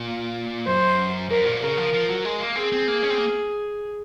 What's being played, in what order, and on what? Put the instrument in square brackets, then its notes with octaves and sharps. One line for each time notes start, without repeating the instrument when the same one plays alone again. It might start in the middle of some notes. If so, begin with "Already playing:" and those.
Already playing: [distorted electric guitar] A#2
[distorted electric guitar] F#2 [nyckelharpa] C5
[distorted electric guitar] F#2 [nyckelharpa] A#4
[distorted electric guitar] A#2
[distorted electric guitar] C#3 [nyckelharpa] A#4
[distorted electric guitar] F3
F3
F#3
G#3
A#3
[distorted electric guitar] C4 [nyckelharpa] G#4
[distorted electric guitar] C4
A#3
C#4
C4
A#3